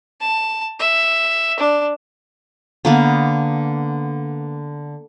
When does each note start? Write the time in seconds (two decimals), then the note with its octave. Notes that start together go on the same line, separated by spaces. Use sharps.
0.21 A5
0.79 E5
1.60 D4
2.85 D3 A#3 B3